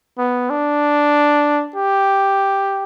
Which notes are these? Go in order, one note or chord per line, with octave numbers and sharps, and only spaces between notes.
B3
D4
G4